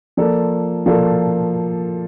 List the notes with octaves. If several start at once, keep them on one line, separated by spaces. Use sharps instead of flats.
F3 A#3 F4 A4 D5
F3 A#3 F4 A4 D5